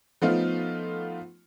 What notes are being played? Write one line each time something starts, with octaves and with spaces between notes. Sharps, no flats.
F3 A3 B3 D#4 F4